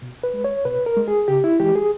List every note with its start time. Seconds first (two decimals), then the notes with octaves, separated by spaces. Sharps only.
0.02 B2
0.24 B4
0.34 G#3
0.44 C#5
0.65 B2 B4
0.86 A#4
0.97 G#3
1.08 G#4
1.28 C#3 G4
1.44 E4
1.60 E3 G#3 G4
1.76 G#4